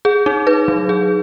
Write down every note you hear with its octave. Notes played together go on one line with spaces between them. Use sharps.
G#4
D#4
B4
F#3
G#4